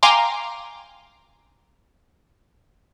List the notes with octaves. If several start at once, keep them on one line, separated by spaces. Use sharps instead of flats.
F5 G5 G#5 A#5 C6 D6